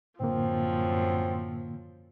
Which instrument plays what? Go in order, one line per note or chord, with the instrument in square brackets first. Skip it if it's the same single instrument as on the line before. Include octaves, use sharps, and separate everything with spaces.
[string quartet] F#2 F3 [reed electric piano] A2 D3 A#3 [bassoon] C4